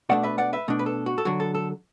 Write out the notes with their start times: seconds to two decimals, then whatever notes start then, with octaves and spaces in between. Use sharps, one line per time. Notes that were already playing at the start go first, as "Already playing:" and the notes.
0.09 B2 A3 D4 D5 F#5
0.23 B4 E5
0.38 D5 F#5
0.53 B4 E5
0.68 B2 A3 D4
0.79 B4
0.86 A4
1.06 F#4
1.18 A4
1.25 D3 F#3 D4 F#4
1.40 A4
1.55 A4